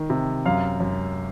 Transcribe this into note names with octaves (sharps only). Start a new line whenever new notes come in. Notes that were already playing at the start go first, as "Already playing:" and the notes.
Already playing: D#3
C3
F#2 F5
F#2